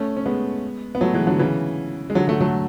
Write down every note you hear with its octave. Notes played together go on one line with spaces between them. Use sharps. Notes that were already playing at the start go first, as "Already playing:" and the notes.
Already playing: A3 C#4
C#4
G#3 B3
B3
F#3 A3
E3 G#3
D3 F#3
C#3 E3
G#3
D3 F#3
F#3 A3
F#3 A3